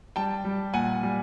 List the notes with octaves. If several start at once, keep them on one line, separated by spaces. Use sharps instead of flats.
G3 G5 A5
G3
A#2 F#5 G#5
G3